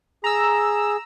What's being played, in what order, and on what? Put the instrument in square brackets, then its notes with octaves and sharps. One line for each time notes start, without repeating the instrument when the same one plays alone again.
[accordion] G#4 [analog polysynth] A#5 E6